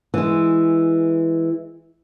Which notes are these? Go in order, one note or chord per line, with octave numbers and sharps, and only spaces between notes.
E3 G#3